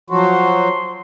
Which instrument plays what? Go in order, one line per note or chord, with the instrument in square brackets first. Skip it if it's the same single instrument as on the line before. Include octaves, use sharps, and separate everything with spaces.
[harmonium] F3 F#3 F#4 [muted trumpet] C6